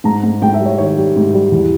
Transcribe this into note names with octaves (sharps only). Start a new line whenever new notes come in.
G#2 A#5
G#2
G#2 G5
E5
G3
C#5
D#3 C#5
G3
G#2
G3
E2